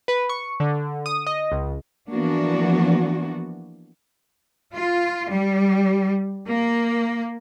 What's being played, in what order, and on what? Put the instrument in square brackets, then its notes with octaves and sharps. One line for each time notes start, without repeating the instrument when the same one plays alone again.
[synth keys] B4
C#6
D3
D#6
D#5
C#2
[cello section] E3 F3 A#3 B3 D4 F#4
F4
G3
A#3